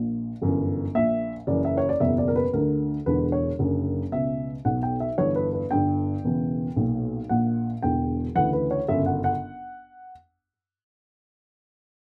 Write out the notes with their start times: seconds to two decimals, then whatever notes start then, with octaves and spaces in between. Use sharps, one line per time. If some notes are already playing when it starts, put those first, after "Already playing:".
Already playing: A#1 A#2
0.42 G1 F#2 E3
0.95 A#1 A#2 E5
1.47 F#1 F#2 E3 D5
1.65 E5
1.77 C#5
1.89 D5
2.00 F#1 E2 B2 E5
2.18 D5
2.28 A#4
2.36 B4
2.53 D2 D3 A#4
3.06 E1 E2 D3 B4
3.32 C#5
3.59 F#1 F#2 D3
4.12 C#2 B2 E5
4.65 B1 B2 F#5
4.83 G5
5.00 E5
5.18 G1 G2 E3 C#5
5.36 B4
5.53 B4
5.71 G1 G2 D3 G5
6.24 E1 E2 C#3 E3
6.76 B1 A#2
7.29 A#1 A#2 F#5
7.82 E1 E2 D3 G5
8.35 D2 C#3 E3 F#5
8.53 B4
8.71 C#5
8.88 G1 F#2 C#3 E5
9.06 F#5
9.24 F#5